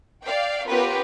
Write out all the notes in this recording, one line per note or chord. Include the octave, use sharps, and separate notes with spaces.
D5 F5 G5
B3 C#4 F4 G4 A#4 B4